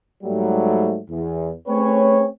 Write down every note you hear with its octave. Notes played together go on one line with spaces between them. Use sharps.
G#2 F#3 G3 A3
E2
A3 C4 C#4 G#4 B4 C#5